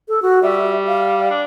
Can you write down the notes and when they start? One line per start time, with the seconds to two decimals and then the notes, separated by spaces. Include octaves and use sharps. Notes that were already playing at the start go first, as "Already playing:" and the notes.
0.09 A4
0.22 F#4
0.43 G3 E5
0.88 F5
1.30 D4